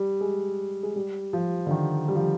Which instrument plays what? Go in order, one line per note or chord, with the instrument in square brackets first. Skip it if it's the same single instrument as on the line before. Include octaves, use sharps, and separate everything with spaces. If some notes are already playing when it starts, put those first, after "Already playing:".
Already playing: [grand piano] G3
G#3
G#3
G3
F3
D3
D#3
G3
F3